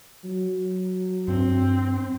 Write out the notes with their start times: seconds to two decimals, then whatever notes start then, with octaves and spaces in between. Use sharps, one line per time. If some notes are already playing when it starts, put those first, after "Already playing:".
0.24 F#3
1.28 G2 C4